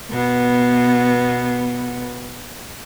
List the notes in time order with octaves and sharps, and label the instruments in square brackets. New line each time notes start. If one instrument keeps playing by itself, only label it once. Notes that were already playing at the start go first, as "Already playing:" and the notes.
[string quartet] B2 B3